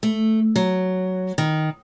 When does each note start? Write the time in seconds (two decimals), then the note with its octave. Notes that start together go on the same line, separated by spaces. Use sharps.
0.03 A3
0.56 F#3
1.38 D#3